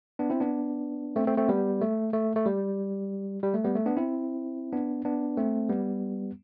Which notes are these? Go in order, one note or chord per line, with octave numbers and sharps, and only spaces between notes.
B3 D4
C4 E4
B3 D4
A3 C4
A3 C4
A3 C4
G3 B3
A3
A3
A3
G3
G3
A3
G3 B3
A3
B3 D4
C4 E4
B3 D4
B3 D4
A3 C4
G3 B3